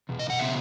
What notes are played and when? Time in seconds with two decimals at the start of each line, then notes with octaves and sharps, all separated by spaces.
0.09 E2 B2
0.19 D#5
0.30 F#5
0.39 C#3 F#3 B3 E5